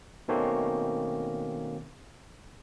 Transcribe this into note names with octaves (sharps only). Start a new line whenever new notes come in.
B2 D#3 A3 A#3 C4 C#4